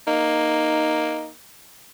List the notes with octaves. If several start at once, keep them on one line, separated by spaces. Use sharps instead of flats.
A#3 D#4